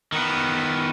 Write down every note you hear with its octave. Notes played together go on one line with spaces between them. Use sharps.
D#3 B3